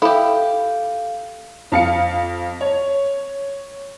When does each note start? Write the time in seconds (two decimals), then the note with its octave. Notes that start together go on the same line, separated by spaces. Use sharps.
0.02 E4 G4 A4 F5
1.72 F2 F5 C#7
2.61 C#5